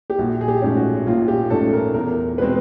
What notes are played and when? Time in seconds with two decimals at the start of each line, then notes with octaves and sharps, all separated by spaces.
0.10 G4
0.19 A#1 F#4
0.41 G#4
0.48 G4
0.62 G#2 F3 A3 C#4
0.76 F#4
1.06 A#1 F4
1.28 G4
1.50 G#2 F3 A3 C#4 A4
1.73 A#4
1.94 E2 A#4
2.38 B2 G#3 C4 B4